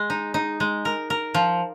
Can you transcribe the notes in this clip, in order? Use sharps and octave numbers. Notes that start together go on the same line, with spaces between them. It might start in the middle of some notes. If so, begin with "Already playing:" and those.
Already playing: G#3
D#4
D#4
G#3
A#4
A#4
F3